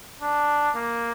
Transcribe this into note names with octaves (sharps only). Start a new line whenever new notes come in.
D4
A#3